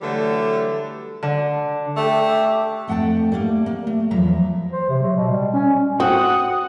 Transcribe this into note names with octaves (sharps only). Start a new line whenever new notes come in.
D3 E3 F#3 G3 A3
D3
A3 D4 G4 E5
F2 A3 F#5 G5 A5
G3 A3 A#3 D#4
A#3
A3
E2 F3 F#3 E5 A#5
C5
C3
F#3
B2
G3
C#4
C4 F#4 F#5 D#6